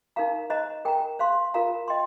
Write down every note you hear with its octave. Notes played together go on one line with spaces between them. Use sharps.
D#4 A#4 F5 A#5
C5 D#5 A#5
A#4 G5 A#5
C5 F5 C6
F4 A#4 F5 A#5
D#5 G5 C6